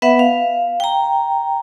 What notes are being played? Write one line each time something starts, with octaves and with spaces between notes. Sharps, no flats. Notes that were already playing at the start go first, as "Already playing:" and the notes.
B3 B4 E5 F#5
F5
G5 A#5